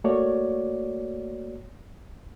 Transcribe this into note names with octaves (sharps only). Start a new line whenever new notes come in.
A3 A#3 F#4 C#5 D5